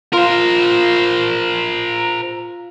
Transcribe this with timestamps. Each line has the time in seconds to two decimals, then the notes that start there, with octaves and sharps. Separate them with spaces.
0.13 F4 A#4 C5 C6